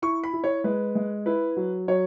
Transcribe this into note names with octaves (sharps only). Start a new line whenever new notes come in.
E4 C#6
B5
E4
C#5
G#3 B4
G#3
E4 B4
F#3
F#3 C#5